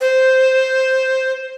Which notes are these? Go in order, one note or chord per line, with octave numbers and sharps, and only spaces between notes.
C5